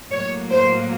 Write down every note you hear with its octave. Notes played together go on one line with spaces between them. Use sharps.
A2 F#3 A#3 C#5
C5